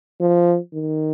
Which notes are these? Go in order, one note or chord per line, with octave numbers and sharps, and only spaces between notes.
F3
D#3